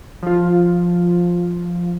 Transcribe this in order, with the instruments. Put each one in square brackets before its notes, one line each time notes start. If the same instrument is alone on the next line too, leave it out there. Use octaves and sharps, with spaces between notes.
[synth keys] F3 F4